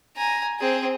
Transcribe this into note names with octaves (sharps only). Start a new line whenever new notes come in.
G#5 A#5
C4 G#4